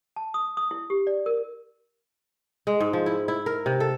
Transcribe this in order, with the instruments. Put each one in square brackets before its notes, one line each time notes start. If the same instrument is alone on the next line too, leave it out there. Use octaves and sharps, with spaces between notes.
[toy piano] A5
D#6
D#6
E4
G4
D5
A#4
[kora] G#3
G#2
F3
E4
E4
A#4
C3
A4